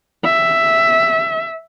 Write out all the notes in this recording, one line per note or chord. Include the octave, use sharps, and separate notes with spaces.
E5